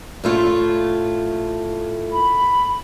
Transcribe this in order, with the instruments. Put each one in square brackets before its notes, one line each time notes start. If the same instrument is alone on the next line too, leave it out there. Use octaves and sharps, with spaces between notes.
[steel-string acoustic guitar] A2 A3 F4
[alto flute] B5